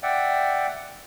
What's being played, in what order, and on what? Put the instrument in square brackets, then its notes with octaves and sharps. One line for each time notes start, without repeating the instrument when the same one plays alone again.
[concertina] D5 E5 F#5 G5